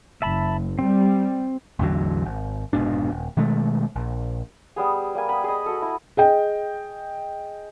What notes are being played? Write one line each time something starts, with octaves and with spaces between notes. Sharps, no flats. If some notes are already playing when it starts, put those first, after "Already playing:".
F#1 E5 A5 B5
G3 C4
A1 E2 D3 F#3
G#1
F1 G#2 B2 D4
D#1
B2 D#3 G#3 A3
A#1
G3 B3 G#4
G3 A#3 G#5
B3 B5
G#4 D#5
F#4 A4
E4
G#4 D#5 G5